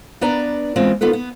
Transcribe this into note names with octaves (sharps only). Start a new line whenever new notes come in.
B3 D4 B4 D5 A#5
E3 G#3 B3 C4 F4
D#2 B3 F4 A4 B4
B3